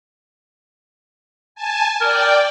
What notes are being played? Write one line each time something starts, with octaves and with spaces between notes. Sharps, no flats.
G#5 A5
A#4 D5 G5